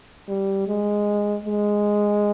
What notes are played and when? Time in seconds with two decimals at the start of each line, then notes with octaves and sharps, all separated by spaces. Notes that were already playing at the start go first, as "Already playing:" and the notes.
0.28 G3
0.68 G#3
1.45 G#3